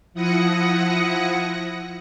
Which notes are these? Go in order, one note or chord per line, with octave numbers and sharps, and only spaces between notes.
F3 E4 F#5 D#6 A#6 C#7